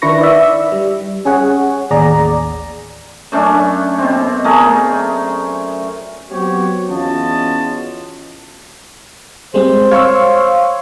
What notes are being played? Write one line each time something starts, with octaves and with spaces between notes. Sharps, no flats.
D#3 D4 E4 B4 C#6 A#6
D5 E5
G3
C#4 G#4 C#5 F#5
A1 D#2 G#4 D5 A#5
F#2 A3 C#4 D4
B2 C4
A3 G#4 A#4
F#3 B3 C4 F#4 G4 C#5
E2 C#4 F4 F#4 D#5 A5
G3 G#3 C4 C5
C#5 F5 C#6 E6